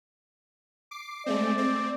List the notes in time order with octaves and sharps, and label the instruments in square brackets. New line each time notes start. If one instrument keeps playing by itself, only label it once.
[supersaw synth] D6 C7
[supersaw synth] G#3 A3 C4 [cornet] D5
[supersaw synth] C4